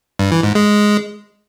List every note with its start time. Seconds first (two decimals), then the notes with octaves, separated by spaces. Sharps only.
0.19 G2
0.31 E3
0.43 G#2
0.55 G#3